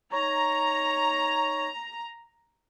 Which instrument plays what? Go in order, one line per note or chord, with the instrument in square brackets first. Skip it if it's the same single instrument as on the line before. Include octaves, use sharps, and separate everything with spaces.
[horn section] D#4 C#5 [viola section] A#5